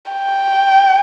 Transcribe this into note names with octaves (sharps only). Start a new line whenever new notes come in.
G5